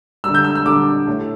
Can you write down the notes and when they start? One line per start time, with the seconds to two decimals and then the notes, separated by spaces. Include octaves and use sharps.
0.24 D3 G3 E6
0.34 G6
0.44 E6
0.55 E6
0.66 D3 G3 D6
1.07 A2 A3